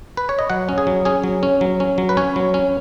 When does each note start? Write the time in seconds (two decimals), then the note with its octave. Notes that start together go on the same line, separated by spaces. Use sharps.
0.17 B4
0.29 C#5
0.39 D#5
0.50 F#3 F#5
0.69 C#4
0.78 G#4
0.87 F#3
1.05 C#4 G#4
1.24 F#3
1.43 C#4
1.61 F#3
1.80 C#4
1.98 F#3
2.09 B4
2.17 C#4 C#5
2.36 F#3
2.54 C#4